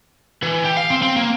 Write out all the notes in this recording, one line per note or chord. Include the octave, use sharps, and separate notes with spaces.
E3
G4
F5
C4
C4
A#3